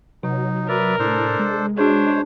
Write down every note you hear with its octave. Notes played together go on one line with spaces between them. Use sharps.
C3 F#3 D#4
A#4 B4 D5 E5
A2 D4 A4 C5
G#3
D4 F#4 G#4 C5 C#5